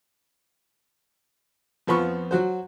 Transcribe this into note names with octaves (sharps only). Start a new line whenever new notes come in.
F2 F3 B3 B5 C#6
F#3 F#4 C5